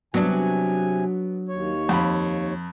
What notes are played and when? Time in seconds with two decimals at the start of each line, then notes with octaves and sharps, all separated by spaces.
0.14 C3 F#3 B3 D4 G#5
1.48 D#2 C#5
1.89 F2 B5